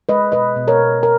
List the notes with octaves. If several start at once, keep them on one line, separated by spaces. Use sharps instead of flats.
G#3 B4 D#5
B2 B4 D#5
B2
A#4 C#5
B2
A#4